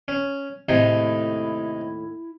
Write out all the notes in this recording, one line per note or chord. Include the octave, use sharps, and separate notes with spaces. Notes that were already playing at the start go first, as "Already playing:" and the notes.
C#4
D#2 A2 C3 D#4 E4 G#4